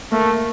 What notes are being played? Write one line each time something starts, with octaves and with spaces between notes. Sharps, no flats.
A3 A#3